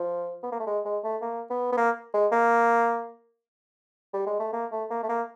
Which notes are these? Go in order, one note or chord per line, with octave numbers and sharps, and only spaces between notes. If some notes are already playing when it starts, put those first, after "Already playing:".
Already playing: F3
B3
A#3
A3
G#3
G#3
A3
A#3
B3
B3
A#3
G#3
A#3
G3
G#3
A3
A#3
A3
A#3
A3
A#3